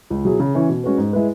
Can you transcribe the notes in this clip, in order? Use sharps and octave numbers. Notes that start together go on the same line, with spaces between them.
C#2
B2 F#3 E4 G#4
C#3
E3 C#4
B2
G#3 C#4 F#4 B4
G#2
G#3 E4 B4